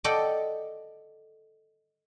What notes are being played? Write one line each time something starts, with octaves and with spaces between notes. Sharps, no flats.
A4 D5 D#5 F#5 G5